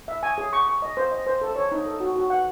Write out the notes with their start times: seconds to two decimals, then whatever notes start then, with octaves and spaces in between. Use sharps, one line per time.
0.08 E5
0.23 G#5
0.38 G#4
0.53 C#6
0.67 C#6
0.82 D#5
0.97 C5
1.11 D#5
1.27 C5
1.41 A4
1.56 C#5
1.72 D#4
1.86 A4
2.00 F#4
2.16 F#4
2.30 F#5